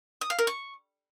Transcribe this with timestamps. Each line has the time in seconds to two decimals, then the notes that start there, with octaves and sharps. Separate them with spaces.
0.21 D#6
0.30 F5
0.39 A#4
0.47 C#6